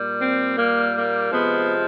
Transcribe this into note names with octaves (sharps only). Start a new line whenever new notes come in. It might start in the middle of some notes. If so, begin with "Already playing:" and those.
Already playing: A#2 G3
C4
A#3
A#3
C3 F3 G#3 B3